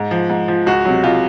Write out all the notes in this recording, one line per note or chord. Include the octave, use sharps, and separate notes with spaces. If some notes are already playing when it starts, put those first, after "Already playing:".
Already playing: G#2
F3
G#2
F3
C#2 F#4
C3 F#3
C#2 F4